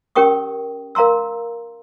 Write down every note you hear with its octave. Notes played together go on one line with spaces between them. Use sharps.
C#4 G4 A#4 G5 C#6 D#6
A#4 F5 A#5 C6 E6